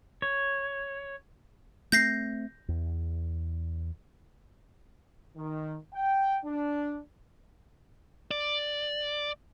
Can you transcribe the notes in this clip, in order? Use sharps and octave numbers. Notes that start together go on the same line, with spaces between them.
C#5
A3 C4 G6 A#6 C7
E2
D#3
G5
D4
D5